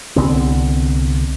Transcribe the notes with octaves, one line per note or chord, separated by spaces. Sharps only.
C2 D3 B3 C4